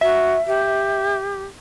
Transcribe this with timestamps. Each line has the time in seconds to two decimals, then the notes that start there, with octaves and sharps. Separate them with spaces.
0.01 F#4 E5
0.47 G4